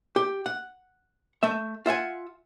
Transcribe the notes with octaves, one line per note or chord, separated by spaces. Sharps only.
G4
F#5
A3 E5
F4 E5 F#5 G#5